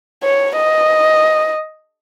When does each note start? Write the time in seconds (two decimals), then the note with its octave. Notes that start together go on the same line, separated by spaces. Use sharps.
0.23 C#5
0.57 D#5